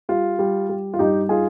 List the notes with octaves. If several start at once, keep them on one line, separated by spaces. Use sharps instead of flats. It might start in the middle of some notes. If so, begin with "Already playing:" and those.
G3 F4
G3
G3
F4
G2 D#4 G4
D#4 F4 G#4